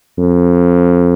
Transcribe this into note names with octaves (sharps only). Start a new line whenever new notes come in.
F2